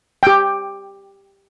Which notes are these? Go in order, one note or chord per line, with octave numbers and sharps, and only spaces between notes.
G4 G5